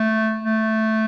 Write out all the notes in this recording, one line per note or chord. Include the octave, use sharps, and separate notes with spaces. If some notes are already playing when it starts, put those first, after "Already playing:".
Already playing: A3
A3